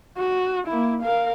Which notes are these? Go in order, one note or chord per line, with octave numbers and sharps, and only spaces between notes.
F#4
A#3 E4
A#4 F5